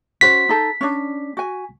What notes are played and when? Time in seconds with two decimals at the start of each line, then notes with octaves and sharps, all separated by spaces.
0.21 C#4 F#4 C5 B6
0.49 D#4 A4
0.81 C#4 D4
1.37 F#4 G#5